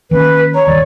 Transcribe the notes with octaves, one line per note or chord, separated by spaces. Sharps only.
D#3 A#3 C#4 B4
C#5 A#5
D#1 G2 D#3 D5